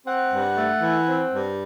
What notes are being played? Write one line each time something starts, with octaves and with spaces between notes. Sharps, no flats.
C4 F#5
G2
A3
E3
C4
G2